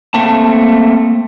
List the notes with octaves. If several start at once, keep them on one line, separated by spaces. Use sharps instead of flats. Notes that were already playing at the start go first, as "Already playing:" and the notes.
A3 A#3 C4 A5